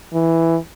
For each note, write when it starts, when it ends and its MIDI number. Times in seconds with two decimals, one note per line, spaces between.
0.14 0.57 52